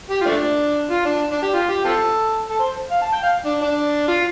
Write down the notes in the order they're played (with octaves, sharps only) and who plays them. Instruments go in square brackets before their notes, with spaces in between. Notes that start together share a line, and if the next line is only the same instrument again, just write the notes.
[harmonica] G4
F4
F3 A3 D4
F4
D4
D4
G4
F4
G4
C4 F4 A4
A4
C5
F5
A5
G5
F5
D4
D4
F4